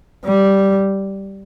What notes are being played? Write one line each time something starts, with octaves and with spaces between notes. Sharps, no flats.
G3